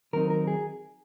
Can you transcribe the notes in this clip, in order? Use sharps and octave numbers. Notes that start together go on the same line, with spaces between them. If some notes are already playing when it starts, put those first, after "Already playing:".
D#3 F#3 C4 D#4 A#4
A#4
G#4